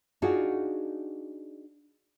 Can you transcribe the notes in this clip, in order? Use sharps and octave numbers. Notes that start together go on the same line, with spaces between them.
D4 D#4 F4 F#4 G#4